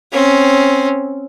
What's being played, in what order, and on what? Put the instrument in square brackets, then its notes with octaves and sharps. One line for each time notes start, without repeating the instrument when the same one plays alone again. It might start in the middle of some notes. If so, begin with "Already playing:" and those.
[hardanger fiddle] C4 C#4